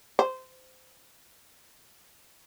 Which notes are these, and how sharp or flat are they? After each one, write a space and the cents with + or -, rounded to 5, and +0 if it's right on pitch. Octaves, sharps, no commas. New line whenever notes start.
C5 -20